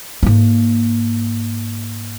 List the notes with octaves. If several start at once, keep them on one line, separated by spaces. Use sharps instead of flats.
G#2 A#3